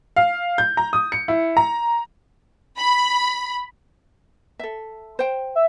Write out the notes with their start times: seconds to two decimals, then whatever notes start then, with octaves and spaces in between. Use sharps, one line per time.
0.16 F5
0.58 G6
0.77 A#5
0.93 D#6
1.12 C#7
1.28 E4
1.57 A#5
2.78 B5
4.59 A4 E5
5.19 C5 G5
5.55 E5